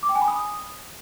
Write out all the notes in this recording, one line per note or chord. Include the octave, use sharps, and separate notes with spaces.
D6
G5
G#5
B5
D#6